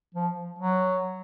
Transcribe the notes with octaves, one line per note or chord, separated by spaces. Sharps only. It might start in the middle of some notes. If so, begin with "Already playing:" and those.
F3
F#3